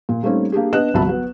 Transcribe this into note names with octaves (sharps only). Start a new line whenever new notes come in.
A#2
G3 A3 A#3 C4 C#4 D#4
A#3 D4 G4 G#4
B3 D4 D#5 F#6 E7
G1 C2 F#3 E5 A5 B5
F#3 B3